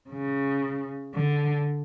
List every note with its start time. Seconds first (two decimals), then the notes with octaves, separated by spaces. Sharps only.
0.10 C#3
1.14 D3